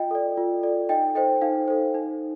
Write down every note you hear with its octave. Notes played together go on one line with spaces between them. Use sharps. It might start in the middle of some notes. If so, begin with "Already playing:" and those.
Already playing: F4 D#5 G5
A4 D5
F4
A4 D5
D#4 D#5 G5
A4 C5 D#5 G5
D#4 F5
A4 C5
D#4